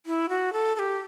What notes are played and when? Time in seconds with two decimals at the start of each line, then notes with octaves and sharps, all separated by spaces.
0.06 E4
0.29 F#4
0.53 A4
0.76 A4
0.79 G4